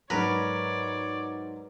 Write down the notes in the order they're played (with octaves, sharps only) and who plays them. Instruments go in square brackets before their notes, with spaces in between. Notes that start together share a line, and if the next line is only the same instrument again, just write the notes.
[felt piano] G#2 F#3 [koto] A#4 B4 [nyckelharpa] C#5 D5